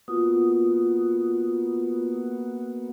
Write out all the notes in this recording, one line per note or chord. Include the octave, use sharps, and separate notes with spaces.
A#3 B3 F4 F#4 D#6